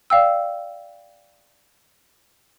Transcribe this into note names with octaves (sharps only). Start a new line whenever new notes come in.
D5 F5 G5 E6